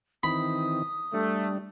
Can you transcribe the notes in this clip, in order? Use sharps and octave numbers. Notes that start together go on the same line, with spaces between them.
D#3 E3 C4 B5 D#6
G3 A3 D4